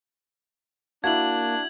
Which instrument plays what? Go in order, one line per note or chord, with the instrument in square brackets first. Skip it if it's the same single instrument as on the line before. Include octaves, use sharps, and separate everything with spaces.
[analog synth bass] A#3 [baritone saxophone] D4 [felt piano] E4 F#4 [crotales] G#6 F#7